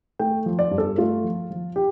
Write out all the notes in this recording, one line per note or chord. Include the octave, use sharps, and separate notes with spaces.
A3 G5
F3
D5
G2
A4
A3 F4
F3
F3
G4